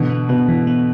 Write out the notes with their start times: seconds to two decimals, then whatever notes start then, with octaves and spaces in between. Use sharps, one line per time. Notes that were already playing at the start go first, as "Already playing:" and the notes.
Already playing: B2 D3 E3
0.10 B3
0.29 B2 B3
0.48 E3
0.67 B3